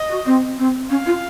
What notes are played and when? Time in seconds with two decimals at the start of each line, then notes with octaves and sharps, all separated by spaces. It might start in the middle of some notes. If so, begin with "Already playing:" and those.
Already playing: D#5
0.09 F#4
0.25 C4
0.58 C4
0.89 C#4 F5
1.06 F4